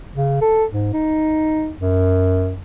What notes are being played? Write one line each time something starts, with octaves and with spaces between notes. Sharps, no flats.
C#3
A4
G#2
D#4
F#2